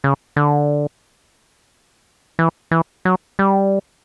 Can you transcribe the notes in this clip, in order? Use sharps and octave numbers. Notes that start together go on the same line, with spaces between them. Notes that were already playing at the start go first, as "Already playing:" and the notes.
C#3
D3
E3
E3
F#3
G3